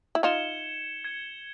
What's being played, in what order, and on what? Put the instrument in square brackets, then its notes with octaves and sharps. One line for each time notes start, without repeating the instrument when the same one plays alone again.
[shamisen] E4
[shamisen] D#4 F4 [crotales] G#6 C#7 E7 G7
[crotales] G#6 C#7 E7 G7